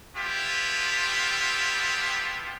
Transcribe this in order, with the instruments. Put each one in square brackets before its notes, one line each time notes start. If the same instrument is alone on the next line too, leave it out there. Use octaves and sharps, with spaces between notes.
[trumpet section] B3 D4 E4 F4 G4